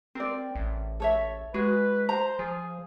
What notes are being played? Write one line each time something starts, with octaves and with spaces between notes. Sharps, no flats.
C4 A#4 D5
A1
A4 C#5 E5
G#3 F#4 B4
C5 A#5
F3 G#4